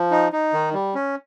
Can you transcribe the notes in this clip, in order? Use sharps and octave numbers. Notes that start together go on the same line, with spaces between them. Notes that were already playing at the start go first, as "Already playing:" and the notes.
Already playing: F3
D#4
D#4
D#3
G3
C#4